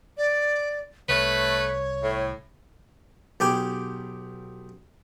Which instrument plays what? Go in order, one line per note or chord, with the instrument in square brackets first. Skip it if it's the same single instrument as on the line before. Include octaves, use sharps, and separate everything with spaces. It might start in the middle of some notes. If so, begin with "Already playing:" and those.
[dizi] D5
[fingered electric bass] C2 [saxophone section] A3 B4 [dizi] C#5
[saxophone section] A2
[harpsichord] B1 G4 G#4 G5 D6